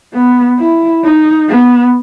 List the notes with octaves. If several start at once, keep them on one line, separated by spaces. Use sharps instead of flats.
B3
E4
D#4
B3